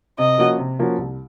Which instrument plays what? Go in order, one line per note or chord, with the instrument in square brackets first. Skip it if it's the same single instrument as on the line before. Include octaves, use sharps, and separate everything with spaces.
[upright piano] C3 [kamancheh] D#5
[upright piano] F3 A#3 C#4 F#4
C3
F3 A#3 C#4 F#4
C2